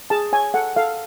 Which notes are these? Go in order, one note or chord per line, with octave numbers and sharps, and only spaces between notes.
G#4 A5
C#5 G#5
A4 F#5
A4 F5